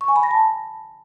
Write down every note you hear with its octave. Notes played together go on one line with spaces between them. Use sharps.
C#6
G#5
B5
A#6
A5